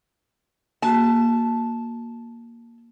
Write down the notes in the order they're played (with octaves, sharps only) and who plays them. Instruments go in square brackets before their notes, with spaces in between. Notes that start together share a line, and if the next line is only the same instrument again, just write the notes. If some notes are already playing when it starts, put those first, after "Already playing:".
[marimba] A#3 F#4 [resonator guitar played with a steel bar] A5